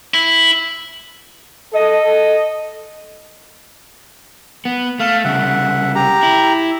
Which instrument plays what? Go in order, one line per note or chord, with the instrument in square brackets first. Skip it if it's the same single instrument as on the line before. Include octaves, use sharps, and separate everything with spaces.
[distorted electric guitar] E4
[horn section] A4 D#5
[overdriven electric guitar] B3
[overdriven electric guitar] A3 [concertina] F5
[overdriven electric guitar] C2 C#3 [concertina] E5 F#5
[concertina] G4 A#5
[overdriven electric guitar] E4